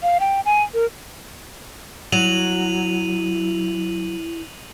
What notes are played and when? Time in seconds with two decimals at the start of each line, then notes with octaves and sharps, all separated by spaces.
0.03 F5
0.20 G5
0.46 G#5
0.74 A#4
2.12 F#3 E4 D#7 F7 F#7